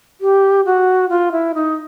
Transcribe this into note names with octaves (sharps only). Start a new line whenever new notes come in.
G4
F#4
F4
E4
D#4